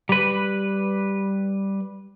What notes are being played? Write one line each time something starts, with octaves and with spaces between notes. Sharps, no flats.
G3 B4